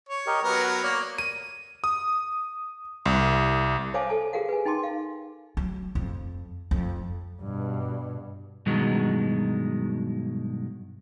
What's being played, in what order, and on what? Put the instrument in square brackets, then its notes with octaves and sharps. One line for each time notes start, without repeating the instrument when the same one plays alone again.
[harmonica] C#5
[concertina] G4 A#4 D#5
[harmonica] F#3 B3 A#4 [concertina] B4
[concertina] F#5
[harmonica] A#3 [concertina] C#5 D5
[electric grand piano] D#7
D#6
C2
[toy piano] C5 C#5 F5 G#5 A5 D6
A4 G#5 A5
G4 G#4 A#4 F5 F#5
B4 G#5
D#4 G5 A5 C6 D6
F5
[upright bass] F#3
F2
F2
[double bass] G2 B2
[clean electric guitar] G2 B2 D#3 F#3 G#3